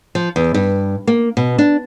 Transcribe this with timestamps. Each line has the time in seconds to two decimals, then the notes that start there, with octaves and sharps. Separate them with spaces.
0.15 F3
0.36 E2
0.54 G2
1.07 A#3
1.37 B2
1.58 D4